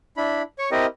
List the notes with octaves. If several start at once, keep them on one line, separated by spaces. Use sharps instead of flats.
D4 E4 B5
C#5 C#6
C4 E4 G4 A#4 D#5